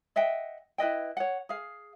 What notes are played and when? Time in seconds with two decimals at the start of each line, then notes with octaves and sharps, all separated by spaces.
0.16 D#5 E5 F#5 G5
0.78 E4 B4 D#5 G5
1.17 C#5 F#5
1.49 G#4 F5